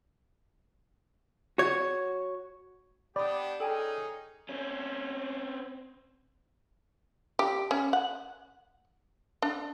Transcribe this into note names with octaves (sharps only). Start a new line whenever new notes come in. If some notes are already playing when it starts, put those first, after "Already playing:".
F#4 C#5
B3 D4 G4 D5 B5 D#6
C#4 D#4 G#4 A4 G5 G#5
C4 C#4
G4
C#4
F#5
D4